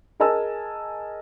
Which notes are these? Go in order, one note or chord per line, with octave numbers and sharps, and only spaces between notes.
G#4 A#4 D#5 G#5 A5 E6